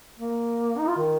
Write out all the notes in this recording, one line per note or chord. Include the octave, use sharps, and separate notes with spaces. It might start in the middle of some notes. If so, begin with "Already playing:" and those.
A#3
D#4
F4
D#3